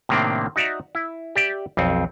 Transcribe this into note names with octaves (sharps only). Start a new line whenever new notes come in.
A2 C3 D#3 A#3 C4 D4
D#4 F#4 D5 E5 A#5
E4
G4 D5 E5 G5
B1 F2 C4